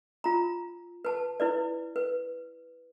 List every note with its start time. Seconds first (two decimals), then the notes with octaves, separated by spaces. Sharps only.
0.24 F4 A#5
1.05 B4 A5
1.40 E4 B4 D5
1.96 B4